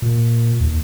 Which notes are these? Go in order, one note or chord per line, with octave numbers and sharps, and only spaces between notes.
A#2
D#2